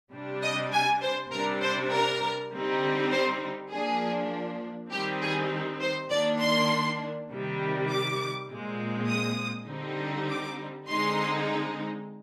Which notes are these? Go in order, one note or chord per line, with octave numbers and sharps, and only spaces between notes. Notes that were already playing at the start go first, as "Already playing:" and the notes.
C3 G3 D4
D#5
G#5
C5
C3 G3 D4 A#4
C5
A#4
D3 G3 C4 D#4
C5
F3 A#3 D4 G#4
D#3 G3 C4 D#4 G4
G#4
C5
D#3 A#3 D4 D5
C6
C3 D#3 G3
D6
A#2 G#3 C4
D#6
D3 G3 C4 D#4
D6
D3 G#3 C4 D#4 C6